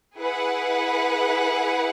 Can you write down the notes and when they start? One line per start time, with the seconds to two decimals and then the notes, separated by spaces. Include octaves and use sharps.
0.17 E4 G#4 B4 F#5